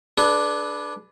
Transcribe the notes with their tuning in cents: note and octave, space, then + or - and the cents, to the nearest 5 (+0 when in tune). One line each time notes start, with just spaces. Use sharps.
D4 +0 G#4 +45 B4 +0